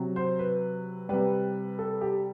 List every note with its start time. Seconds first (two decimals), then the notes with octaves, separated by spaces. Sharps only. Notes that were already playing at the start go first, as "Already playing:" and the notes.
Already playing: C3 F#3
0.16 C5
0.39 B4
1.09 C3 G3 B4
1.79 A4
2.01 G4